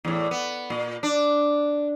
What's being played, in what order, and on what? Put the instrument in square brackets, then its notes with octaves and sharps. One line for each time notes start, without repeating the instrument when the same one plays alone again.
[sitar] E2 A2
B3
A#2
D4